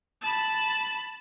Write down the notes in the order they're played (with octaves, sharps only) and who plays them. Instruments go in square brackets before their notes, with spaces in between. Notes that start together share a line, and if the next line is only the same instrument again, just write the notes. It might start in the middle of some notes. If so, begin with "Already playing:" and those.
[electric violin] A5 B5